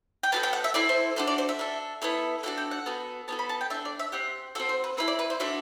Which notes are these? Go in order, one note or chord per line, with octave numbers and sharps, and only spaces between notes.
G5
B3 F#4 A4 A5
G5
F#5
E5
C4 E4 A4 D5
C5
D4 F#4 A4 C5
D5
C5
E5
D4 A4
B3 E4 A4
D4 F#4 A4 F#5
G5
F#5
B3 F#4 A4
B3 F#4 A4 A5
B5
A5
G5
D4 A4 E5
D5
E5
C4 G4 F#5
C4 F#4 A4 F#5
C5
B4
C4 E4 A4 B4
D5
B4
C5
D4 F#4 A4 E5